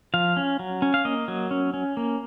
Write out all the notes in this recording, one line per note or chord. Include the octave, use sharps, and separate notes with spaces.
F3 F5
C#4
F#3
C#4
F5
A#3 D#5
F#3
C#4
C#4
A#3